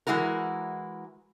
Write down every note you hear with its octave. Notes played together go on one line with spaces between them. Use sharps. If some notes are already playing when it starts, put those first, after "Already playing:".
E3 G#3 E4 F#4 A#4